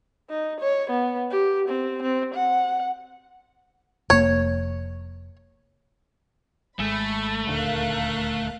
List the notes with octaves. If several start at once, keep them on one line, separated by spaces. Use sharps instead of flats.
D#4
C#5
B3
G4
C4
C4
F#5
F1 A#3 C#5
G#1 G#3 A3 B5
D#1 D2 D3 A#4 F5 F#6